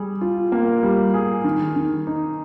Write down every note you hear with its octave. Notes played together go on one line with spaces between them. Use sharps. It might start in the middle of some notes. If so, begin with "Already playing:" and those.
Already playing: G3 G#4
F4
A#3
G3
G#4
D#3
D#3
D#4